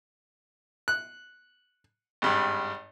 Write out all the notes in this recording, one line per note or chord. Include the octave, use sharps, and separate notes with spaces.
F#6
G#1 G2